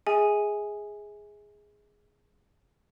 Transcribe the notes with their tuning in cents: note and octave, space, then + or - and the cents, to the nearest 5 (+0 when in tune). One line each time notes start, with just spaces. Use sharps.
G#4 +0 E5 -45 G#5 +0